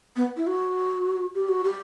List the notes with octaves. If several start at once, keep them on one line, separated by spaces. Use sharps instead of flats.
B3
E4
F#4
G4
F#4
G4